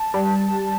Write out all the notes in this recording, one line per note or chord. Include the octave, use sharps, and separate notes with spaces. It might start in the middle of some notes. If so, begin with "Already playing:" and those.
Already playing: A5
G3